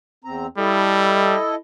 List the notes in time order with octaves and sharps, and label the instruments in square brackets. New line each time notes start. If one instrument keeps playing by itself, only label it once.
[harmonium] E2 C4 A#5
[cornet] G3 [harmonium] E4 A4 D#5